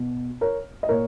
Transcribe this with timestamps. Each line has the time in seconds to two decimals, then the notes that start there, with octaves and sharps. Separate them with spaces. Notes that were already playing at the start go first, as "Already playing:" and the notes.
Already playing: B2
0.41 A#4 C#5
0.83 D#5
0.89 A#2 A#4 C#5